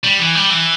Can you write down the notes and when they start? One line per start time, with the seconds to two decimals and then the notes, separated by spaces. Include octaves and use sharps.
0.04 G3
0.19 E3
0.35 G3
0.50 E3